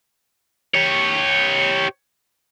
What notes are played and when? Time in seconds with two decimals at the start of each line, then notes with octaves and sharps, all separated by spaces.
0.74 G4 C#5